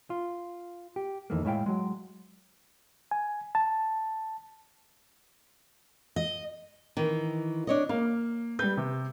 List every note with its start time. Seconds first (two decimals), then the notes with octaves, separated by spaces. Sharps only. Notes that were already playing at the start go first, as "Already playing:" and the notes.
0.10 F4
0.96 G4
1.30 F2 D#3 E3 A3 A#3
1.45 A2 G#3 E4 F5 G5
1.66 F#3 G#3
3.11 G#5
3.55 A5
6.16 D#5
6.97 D#3 E3
7.67 D4 C#5 D#5
7.89 A#3 F5
8.59 G3 B4 G6
8.77 C3